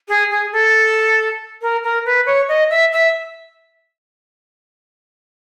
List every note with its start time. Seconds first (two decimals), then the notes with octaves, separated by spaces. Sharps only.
0.09 G#4
0.31 G#4
0.53 A4
1.62 A#4
1.84 A#4
2.05 B4
2.26 C#5
2.49 D#5
2.70 E5
2.92 E5